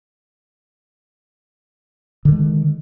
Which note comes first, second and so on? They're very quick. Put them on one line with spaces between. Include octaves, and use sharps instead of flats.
D3 D#3 G#3